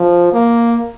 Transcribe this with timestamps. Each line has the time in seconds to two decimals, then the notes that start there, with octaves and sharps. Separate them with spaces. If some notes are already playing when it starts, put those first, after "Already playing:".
Already playing: F3
0.33 A#3